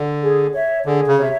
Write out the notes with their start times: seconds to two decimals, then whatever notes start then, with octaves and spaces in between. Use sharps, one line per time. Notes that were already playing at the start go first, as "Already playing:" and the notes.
Already playing: D3
0.21 G#4
0.53 C#5 E5
0.86 D3 G#4
1.07 C#3
1.18 C3 C#5 E5